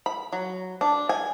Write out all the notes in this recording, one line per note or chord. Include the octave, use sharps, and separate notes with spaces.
B5
F#3
D4
G#5